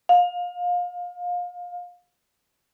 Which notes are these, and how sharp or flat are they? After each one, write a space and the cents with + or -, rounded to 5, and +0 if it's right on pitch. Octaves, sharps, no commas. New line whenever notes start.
F5 +25